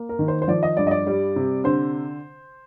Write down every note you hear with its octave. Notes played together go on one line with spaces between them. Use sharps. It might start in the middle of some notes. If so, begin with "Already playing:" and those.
Already playing: A#3
A#4
D#3
C5
C5
F3 D5
D#5
G2 D5
D#5
D5
G3
C3
D3 C5